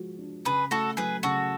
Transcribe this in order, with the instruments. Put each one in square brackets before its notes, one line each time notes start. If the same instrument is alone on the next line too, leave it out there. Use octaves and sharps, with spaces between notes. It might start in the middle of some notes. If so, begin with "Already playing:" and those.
Already playing: [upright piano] F3 G#3 F#4
D4
[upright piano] C#3 [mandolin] G#4 B4
[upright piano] A3 [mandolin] F#4 A4
[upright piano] F#3 [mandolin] G#4 B4
[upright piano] C#3 [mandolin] F#4 A4